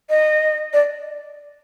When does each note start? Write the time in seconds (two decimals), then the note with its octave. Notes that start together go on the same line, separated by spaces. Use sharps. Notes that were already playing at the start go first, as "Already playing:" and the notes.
0.10 D#5
0.73 D5